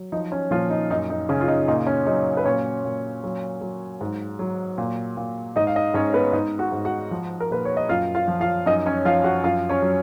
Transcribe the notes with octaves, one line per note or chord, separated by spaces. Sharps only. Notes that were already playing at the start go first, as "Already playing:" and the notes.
Already playing: F#3
F3 D#4
C#4
A#2 F3 F4
D#4
F#2 D#4
D#4
C#3 C#4
F4
D#4
A#2 D#4
C#4
F#3 D#4
B4
A#2 C#4 C#5
A#2
F#3
F#3
G#2
F#3
A#2
A#2
G#2 D#4 D#5
F5
D#4 D#5
G#2 C#4 C#5
B3 B4
G#2 D#4 D#5
F#4 F#5
G#2
F#4 F#5
F3
A#4
A#2 B4
C#5
D#5
F#2 F4 F5
F4 F5
F3
F4 F5
F#2 D#4 D#5
C#4 C#5
F3 F4 F5
F#4 F#5
F#2 F4 F5
C#4 C#5
F#3